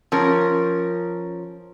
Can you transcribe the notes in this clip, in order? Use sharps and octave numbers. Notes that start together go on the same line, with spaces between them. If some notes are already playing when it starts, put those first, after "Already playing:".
F3 C#4 A#4